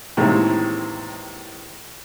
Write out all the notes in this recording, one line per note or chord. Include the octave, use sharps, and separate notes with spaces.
A2 C3 D#3 E3 G#3 A#3